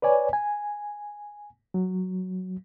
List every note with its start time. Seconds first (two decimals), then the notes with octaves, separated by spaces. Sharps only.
0.02 B4 C#5 D5 G#5
0.33 G#5
1.74 F#3